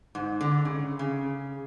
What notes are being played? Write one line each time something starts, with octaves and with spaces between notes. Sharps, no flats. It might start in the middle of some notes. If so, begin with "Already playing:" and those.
G#2
D3
C#3
C#3